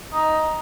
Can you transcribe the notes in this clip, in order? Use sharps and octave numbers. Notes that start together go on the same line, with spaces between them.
D#4